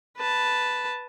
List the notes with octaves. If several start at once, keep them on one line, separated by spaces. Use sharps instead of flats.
B4 A5